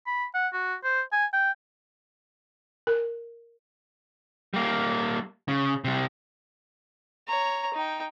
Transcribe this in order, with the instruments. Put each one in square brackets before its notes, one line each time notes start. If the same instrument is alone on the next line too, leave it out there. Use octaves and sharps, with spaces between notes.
[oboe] B5
F#5
F#4
C5
G#5
G5
[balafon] A#4
[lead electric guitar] G3 A#3
C#3
C3 G3
[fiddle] C#5 A#5
D#4 G5